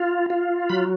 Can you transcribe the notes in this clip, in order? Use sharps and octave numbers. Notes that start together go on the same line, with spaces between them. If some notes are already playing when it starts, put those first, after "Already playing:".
Already playing: F4
F4
F#3 B5